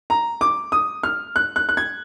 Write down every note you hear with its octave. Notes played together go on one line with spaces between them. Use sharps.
A#5
D6
D#6
F6
F#6
F#6
F#6
G#6